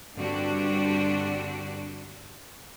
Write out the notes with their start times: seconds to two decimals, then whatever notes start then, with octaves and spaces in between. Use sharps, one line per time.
0.16 G2 D3 C4 D4 F#4 G4